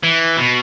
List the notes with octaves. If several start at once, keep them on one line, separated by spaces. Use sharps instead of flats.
E3
B2